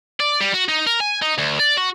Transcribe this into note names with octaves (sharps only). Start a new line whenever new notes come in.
D5
G3
F#4
D#4
A#4
G#5
D#4
D2
D5
F#4